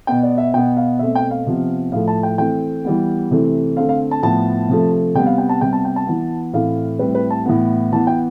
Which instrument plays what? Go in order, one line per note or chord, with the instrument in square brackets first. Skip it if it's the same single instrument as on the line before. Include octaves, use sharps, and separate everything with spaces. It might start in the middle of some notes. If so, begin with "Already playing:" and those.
[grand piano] B2 B3 G5
D5
E5
B2 B3 G5
F5
B2 A3 C4 E5
G5
F5
C3 F3 B3
A2 F3 A3 F5
A5
G5
E3 A3 C4 G5
E3 G3 B3
C3 E3 A3 C4
D3 A3 C4 F5
F5
A5
A2 F3 B3 A5
C3 F3 A3
C3 G3 B3 G5
F5
G5
A5
C3 G3 B3 G5
A5
G5
A5
E3 B3
A2 E3 A3 C4 F5
A2 G3 C4 B4
B4
A5
A2 E3 B3
E3 B3 A5
G5